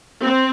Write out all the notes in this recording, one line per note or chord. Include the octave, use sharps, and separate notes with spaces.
C4